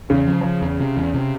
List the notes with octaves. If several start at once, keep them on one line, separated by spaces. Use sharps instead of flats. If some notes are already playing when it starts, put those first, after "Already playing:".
E2 C#3
F3
F3
E2
C3
E2
C3